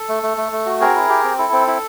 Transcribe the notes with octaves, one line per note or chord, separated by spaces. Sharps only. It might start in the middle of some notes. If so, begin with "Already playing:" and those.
Already playing: A4
A3
A3
A3
A3
F#4
C4 G#4 A#4
E4
G4
C4
E4 A4
C4
E4